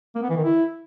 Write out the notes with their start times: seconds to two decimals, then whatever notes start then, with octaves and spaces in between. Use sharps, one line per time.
0.16 A#3
0.23 B3
0.30 E3
0.37 D#3
0.44 E4